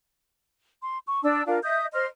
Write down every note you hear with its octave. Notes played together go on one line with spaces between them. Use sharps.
C6
C#6
D4 A5 E6
D4 F4 A#4 F5
D#5 E5 D#6 G6
C5 D#5 C6 F6